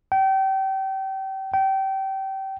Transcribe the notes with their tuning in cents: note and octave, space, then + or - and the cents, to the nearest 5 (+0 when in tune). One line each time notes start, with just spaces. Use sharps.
G5 -30
G5 -25